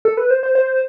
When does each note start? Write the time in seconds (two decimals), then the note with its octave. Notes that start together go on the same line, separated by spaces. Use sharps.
0.05 A4
0.17 B4
0.31 C5
0.43 C5
0.55 C5